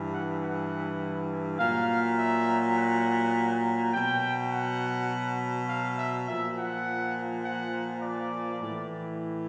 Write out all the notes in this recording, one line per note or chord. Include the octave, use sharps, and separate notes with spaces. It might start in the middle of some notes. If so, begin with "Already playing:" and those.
Already playing: G2 E3
F#5
F#5
A#2 F#3 F5
E5
F#5
B2 F#3 G5
F#5
F5
E5
A#2 F3 E5
F#5
F#5
D5
A2 E3